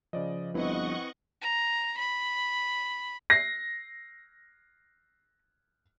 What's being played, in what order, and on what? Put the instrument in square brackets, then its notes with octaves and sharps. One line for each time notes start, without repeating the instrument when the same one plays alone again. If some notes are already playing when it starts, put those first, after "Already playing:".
[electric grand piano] C#3 D5 D#5 [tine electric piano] F3
[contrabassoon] G1 [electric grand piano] C4 E4 B4 [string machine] D#5 F#5 C#6
[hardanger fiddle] A#5
B5
[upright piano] A#6 C7